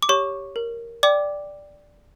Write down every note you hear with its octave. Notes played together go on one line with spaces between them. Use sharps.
D6
G4 C#5 C#6
A#4
D5 G5 D6